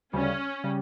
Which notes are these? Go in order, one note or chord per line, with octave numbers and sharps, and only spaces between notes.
D2 C#3 G3 C#4
C#3 G3